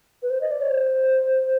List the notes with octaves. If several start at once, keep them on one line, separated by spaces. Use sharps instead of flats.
B4
C5
D#5
D5
C#5
C5